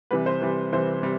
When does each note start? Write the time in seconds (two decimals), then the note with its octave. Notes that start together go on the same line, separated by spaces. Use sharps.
0.11 C3 E3 G3 B4
0.26 C5
0.41 C3 E3 G3
0.72 C3 E3 G3 C5
1.02 C3 G3